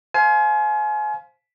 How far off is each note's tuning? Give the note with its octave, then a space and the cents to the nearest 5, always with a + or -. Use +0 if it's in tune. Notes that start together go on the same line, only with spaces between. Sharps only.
C5 +0 F5 +0 G#5 +35